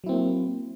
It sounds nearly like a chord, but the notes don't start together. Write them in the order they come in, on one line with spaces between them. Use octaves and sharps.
F#3 E4 C4 A#3